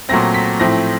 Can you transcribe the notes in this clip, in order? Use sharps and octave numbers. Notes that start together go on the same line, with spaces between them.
A#2 F#3 A3 C4 A#6
B6
A2 F3 A3 C4 A#6